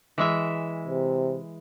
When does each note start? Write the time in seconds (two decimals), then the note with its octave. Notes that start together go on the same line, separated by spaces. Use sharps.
0.18 E3 G#3 E5
0.88 C3